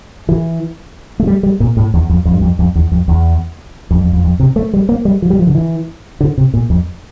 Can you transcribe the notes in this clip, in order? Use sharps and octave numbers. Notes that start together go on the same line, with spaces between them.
E3
A3
G3
G3
A#2
A2
E2
F2
F2
G2
F2
F2
E2
F2
E2
F2
F2
F2
F2
C3
A3
G3
A#3
G3
F3
G3
F3
D3
E3
D3
C3
A#2
F2